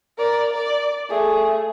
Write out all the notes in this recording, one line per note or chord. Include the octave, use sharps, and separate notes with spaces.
A#4 D5
D5
A3 G#4